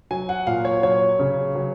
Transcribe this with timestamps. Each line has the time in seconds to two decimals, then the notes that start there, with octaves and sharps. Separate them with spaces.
0.11 F#3 G#5
0.29 F#5
0.47 A#2 F5
0.65 C#5
0.83 F#3 C#5
1.20 C#3
1.55 F#3